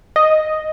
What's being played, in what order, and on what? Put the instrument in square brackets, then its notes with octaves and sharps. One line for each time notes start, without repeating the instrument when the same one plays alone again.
[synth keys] D#5